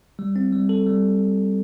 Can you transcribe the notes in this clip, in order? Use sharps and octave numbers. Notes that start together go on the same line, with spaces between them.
G3
C4
G3
A4
G3